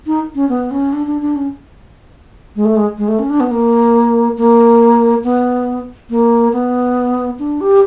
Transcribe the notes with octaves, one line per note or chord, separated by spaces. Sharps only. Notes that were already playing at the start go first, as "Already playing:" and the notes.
D#4
C#4
B3
C#4
D4
D4
D4
C#4
G#3
A3
G#3
G#3
A3
C#4
D4
B3
A#3
A#3
B3
A#3
B3
D4
G4